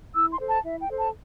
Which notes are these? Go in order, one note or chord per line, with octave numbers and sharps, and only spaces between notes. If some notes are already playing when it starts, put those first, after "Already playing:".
E4 E6
C6
A4 C5
A5
E4 E5
G5
A4 C5
A5